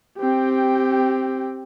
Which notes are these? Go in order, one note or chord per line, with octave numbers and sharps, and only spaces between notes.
C4 G4